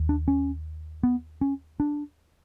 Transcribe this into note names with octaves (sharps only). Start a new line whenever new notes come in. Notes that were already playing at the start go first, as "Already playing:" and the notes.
Already playing: D#2
D4
C#4
B3
C#4
D4